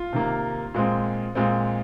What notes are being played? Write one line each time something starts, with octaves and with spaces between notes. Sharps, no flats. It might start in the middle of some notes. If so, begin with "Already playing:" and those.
Already playing: F4
C3 D#3 A#3
A#2 G#3 C4
A#2 G#3 C4